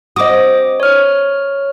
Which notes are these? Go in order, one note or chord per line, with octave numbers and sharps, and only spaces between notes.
C4 F#4 D#5 D6 D#6
C#5 F6